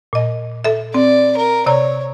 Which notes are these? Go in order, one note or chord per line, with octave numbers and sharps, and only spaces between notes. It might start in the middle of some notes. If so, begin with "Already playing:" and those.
A#2 D#5
A4 E5
C4 D5
A#4
C3 C#5 D5 A#5